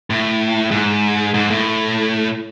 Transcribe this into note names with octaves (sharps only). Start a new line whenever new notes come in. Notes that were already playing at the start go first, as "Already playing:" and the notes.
A2
G#2
G#2
A2